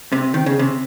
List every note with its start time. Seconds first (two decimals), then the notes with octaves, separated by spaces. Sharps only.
0.12 C3
0.34 D#3
0.46 C#3
0.59 C3